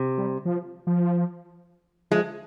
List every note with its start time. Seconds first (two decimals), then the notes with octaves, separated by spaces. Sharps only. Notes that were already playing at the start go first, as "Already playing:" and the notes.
Already playing: C3
0.18 G3
0.45 F3
0.87 F3
2.11 F3 G#3